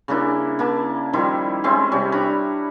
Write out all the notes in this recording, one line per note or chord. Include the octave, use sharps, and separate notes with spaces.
C#3 A#3 D4 E4
A#3 E4 A5
D#3 F3 G3 E4
G#3 C4 C#4 E4
C3 G3 C#4
D4 C#5 A#5 B5